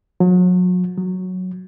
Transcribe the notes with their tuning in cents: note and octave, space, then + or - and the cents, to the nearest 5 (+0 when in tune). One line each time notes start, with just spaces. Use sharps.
F#3 -35
F#3 -5